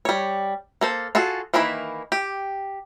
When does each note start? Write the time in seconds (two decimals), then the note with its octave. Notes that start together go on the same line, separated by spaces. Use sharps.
0.05 G3 C#5
0.81 A#3 A4 C5
1.15 F4 F#4 G#4 A4
1.54 D#3 E3 A#3 E4 B5
2.12 G4